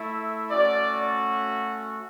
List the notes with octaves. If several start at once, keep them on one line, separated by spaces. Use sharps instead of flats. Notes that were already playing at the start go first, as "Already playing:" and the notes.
Already playing: A3 E4
A3 C#4 F#4 D5